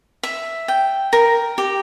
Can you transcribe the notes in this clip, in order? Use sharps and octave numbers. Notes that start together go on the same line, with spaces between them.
E5
G5
A#4
G4